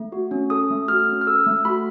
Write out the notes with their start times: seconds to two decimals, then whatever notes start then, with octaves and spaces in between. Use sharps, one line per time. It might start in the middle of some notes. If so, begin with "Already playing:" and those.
Already playing: A3
0.12 F#4
0.31 C#4
0.50 A4 D#6
0.70 A3
0.88 F#4 F6
1.08 C#4
1.21 F6
1.27 A4 E6
1.46 A3
1.65 F#4 B5